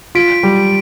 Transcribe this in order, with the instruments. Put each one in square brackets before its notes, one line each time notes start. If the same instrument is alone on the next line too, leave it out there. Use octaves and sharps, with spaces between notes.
[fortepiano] F4 [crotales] B6 D7
[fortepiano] G3